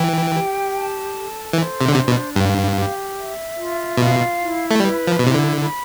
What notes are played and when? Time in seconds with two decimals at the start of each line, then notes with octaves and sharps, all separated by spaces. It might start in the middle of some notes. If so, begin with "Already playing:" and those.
Already playing: E3 G5
0.31 G4
0.72 A5
1.13 A4
1.53 E3 C5
1.81 C3
1.88 D3
1.95 C3 D4
2.07 B2
2.34 G2 F5
2.76 G4
3.16 E5
3.57 F4
3.98 B2 F5
4.38 E4
4.71 A3
4.79 G3 B4
5.07 F3
5.19 B2 E4
5.27 C3
5.34 D3
5.61 B5